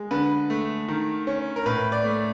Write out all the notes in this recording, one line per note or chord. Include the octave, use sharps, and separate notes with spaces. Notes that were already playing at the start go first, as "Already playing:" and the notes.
Already playing: G#3
D3 B4
A3
D#3
C#4
A#4
A2 B4
D5
A3